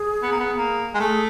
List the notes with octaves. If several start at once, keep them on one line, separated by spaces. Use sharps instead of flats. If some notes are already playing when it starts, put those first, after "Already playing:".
Already playing: G#4
B3
A#3
B3
A#3
G#3
A3 G#4